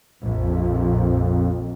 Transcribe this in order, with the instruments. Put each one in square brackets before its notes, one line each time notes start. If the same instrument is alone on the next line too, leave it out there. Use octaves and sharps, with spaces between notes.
[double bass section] A#1 [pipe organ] F2